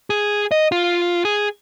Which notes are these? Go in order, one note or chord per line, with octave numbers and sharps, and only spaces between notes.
G#4
D#5
F4
G#4